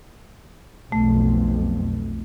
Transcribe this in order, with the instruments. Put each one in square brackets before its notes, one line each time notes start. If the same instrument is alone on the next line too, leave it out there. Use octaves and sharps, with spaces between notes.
[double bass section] B1 F2 [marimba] A3